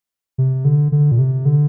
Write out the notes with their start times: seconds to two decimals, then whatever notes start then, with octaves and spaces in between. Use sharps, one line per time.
0.38 C3
0.65 D3
0.92 D3
1.12 A#2
1.19 C3
1.45 D3